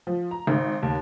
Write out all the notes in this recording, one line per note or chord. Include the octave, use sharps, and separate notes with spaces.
F3
A#5
G#1
D#2